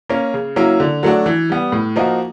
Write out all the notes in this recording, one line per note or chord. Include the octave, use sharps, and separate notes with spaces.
A#3 C#4
C#3
F#3 A#3 C#4 E4
D3
F#3 A3 D4 F#4
E3
G3 B3
A2
F3 A#3 D#4 F#4